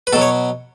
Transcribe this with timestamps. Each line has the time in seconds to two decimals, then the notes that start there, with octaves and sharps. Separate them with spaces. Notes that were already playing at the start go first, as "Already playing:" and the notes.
0.07 B4
0.13 B2 A4
0.15 F#3
0.21 C#5